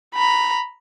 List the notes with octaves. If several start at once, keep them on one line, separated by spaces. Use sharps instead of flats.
A#5 B5